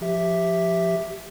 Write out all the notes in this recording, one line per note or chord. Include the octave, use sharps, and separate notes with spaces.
F3 G4 E5